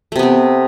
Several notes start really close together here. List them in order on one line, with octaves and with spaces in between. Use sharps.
A3 C3 B3 C4